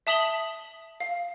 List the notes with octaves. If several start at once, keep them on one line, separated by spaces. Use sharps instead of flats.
E5 A5 D#6 B6 F#7 G7
F5